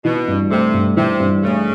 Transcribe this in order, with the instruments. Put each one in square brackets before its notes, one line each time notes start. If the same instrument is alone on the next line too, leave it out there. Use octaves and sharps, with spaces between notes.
[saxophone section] B2 [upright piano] E3
[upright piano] G2
[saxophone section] C3 [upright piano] A3
[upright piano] G2
[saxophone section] C3 [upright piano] E3
[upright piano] G2
[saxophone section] C#3 [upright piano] A3